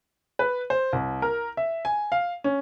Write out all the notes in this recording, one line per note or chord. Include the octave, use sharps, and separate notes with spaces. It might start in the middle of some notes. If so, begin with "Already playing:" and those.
B4
C5
C2
A#4
E5
G#5
F5
C#4